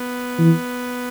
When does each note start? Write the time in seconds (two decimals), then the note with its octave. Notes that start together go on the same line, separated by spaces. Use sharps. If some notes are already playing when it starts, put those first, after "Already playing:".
Already playing: B3
0.38 E3